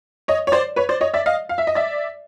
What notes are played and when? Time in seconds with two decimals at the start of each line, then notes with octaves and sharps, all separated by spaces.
0.28 C#5 D#5
0.47 C#5
0.52 C5 D5
0.76 B4 C#5
0.89 C5 D5
1.01 C#5 D#5
1.14 D5 E5
1.26 D#5 F5
1.49 F5
1.58 E5
1.67 D#5
1.75 D5 E5